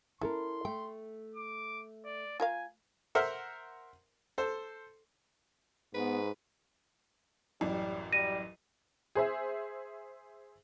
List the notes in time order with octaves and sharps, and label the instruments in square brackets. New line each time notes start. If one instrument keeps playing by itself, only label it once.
[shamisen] C#4 [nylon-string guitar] E4 A4 A#4 [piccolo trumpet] C6
[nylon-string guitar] A3 [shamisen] G5
[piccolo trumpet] D6
D5
[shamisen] F4 A#4 F5 [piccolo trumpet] G#5
[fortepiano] A#4 C5 E5 F#5
A4 C5
[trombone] G#2 [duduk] B3 [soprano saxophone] B4
[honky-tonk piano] A1 F#2 E3 [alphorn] G3
[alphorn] G3 [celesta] A#6 D#7
[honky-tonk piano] G#4 C5 E5